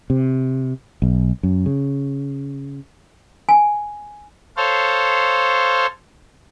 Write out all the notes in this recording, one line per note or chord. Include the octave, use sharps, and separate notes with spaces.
C3
B1
F#2
C#3
G#5
A4 C5 C#5 F5